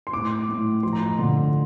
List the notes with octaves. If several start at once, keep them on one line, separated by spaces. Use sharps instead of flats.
C6
A2 D6
A2
F3 C6
A#5
C6
D3